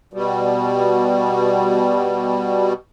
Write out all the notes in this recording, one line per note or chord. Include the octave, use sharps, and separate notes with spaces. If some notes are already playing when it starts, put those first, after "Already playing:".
B2 G3